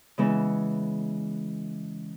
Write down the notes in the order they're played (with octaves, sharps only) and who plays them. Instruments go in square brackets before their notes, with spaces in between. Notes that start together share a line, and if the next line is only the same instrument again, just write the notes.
[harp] C#3 E3 G#3 B3 E4